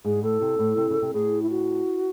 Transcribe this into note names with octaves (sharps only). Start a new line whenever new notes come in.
G#2 G#4
A2 A4
C3
A2
C3
C#3
C3
A2 G#4
E4
F#4